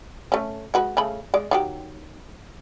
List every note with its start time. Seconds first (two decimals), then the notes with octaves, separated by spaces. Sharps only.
0.32 A3 C#4
0.74 G#3 F#4 B4
0.97 C#3 A3 B5
1.34 G#3 D5
1.51 D#3 F#3 G4